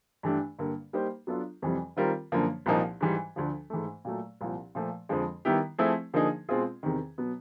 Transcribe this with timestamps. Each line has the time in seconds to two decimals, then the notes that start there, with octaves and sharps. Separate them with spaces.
0.23 G2 E3 A3 D4 G4
0.59 G2 D3 G3 A#3
0.93 G3 A#3 D#4 G4 C5
1.27 F#3 B3 D4 F4 A4
1.62 F2 C3 E3 G3
1.97 D#3 G3 C4 F4 A#4
2.32 F#2 D3 F3 A#3
2.66 C2 A#2 F3 A#3 D#4
3.01 G#2 E3 G3
3.36 D2 D3 F3
3.70 G#2 E3 A3
4.05 A#2 F#3 A3
4.41 C2 A#2 F3
4.75 A#2 F3 A3
5.09 F2 D3 F3 G#3
5.45 D#3 G3 B3 E4 G4
5.78 F3 A3 C4 E4 G#4
6.14 D3 F3 A#3 D#4 G#4
6.49 B2 G#3 C4 F4 G#4
6.83 E2 C3 D#3
7.18 B2 F#3 B3